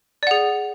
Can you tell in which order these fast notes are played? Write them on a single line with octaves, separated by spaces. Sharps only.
D5 F#5 G#4